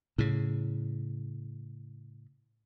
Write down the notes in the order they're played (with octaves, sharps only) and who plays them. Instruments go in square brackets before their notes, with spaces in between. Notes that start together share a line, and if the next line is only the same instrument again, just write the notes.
[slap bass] A2 C#3